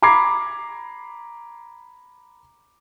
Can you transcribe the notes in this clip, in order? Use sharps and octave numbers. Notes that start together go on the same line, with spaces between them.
A#5 B5 D6 G#6 C7